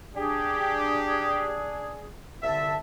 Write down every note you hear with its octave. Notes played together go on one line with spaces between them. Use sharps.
D4 G4 G#4
C2 D3 E5 A5